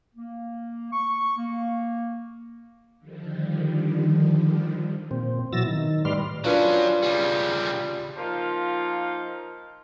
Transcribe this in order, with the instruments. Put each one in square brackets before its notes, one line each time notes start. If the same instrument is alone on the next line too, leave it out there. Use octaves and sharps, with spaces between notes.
[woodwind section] A#3
C#6
A#3
[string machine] D3 D#3 F3 G3
[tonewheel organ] A#2 C4
B2 E3 F#3 E6 A6 A#6
D#3
A2 G3 B4 D5 C6 F6
[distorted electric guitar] F#3 C#4 [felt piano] D4 F4 B4
[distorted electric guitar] C#3 G3
[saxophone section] F3 A#3 D#4 F4